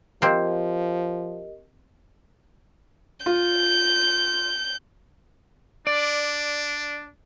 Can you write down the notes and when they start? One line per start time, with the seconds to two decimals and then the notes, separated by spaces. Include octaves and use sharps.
0.22 F3 A#3 C4 G4 A#4 D#5
3.26 F4 G6
5.87 D4 D5